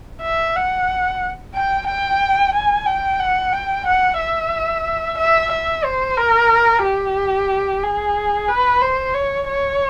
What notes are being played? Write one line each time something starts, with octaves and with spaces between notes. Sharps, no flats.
E5
F#5
G5
G5
G#5
G5
F#5
G5
F#5
E5
E5
E5
C5
A#4
G4
G#4
B4
C5
C#5
C#5